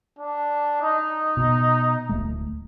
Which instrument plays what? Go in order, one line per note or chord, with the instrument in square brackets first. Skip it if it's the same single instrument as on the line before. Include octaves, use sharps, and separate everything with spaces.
[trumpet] D4
D#4
[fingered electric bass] B2
D1 D#2 A3